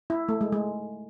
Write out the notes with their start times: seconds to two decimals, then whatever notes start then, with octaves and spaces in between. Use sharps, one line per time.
0.10 E4
0.29 A3
0.41 G#3
0.52 G#3